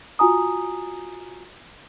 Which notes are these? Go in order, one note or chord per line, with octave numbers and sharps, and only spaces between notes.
F4 F#4 G#5 A#5 D#6